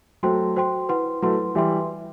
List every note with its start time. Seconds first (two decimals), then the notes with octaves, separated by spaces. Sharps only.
0.23 F#3 A3 F#4 C5 G5 C6
0.56 F#4 C5 G5 C6
0.89 E4 B4 F#5 C6
1.22 F#3 A3 E4 B4 F#5 C6
1.55 E3 G3 B4 E5 G5 C6